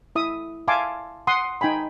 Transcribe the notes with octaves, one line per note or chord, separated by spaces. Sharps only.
E4 E5 D#6
E5 F5 G#5 A5 C6 D6
F#5 C6 D#6
D#4 G5 G#5 B5